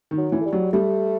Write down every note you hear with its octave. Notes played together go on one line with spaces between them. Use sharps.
D#3
F#3
E3
A3
G3
F#3
G3 A3